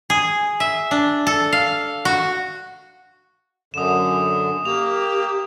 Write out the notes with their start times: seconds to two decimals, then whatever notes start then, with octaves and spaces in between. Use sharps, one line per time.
0.10 G#4
0.60 E5
0.91 D4
1.27 A4
1.52 F5
2.05 F#4
3.74 F#2 D3 D#6 E7
4.65 A#3 G4 F7